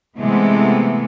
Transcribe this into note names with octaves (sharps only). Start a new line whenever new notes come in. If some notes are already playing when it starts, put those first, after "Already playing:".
C3 E3 G#3 A3 B3